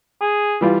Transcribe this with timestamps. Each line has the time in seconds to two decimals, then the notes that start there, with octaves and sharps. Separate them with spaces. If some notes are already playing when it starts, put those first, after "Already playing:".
0.21 G#4
0.61 E3 G3 F4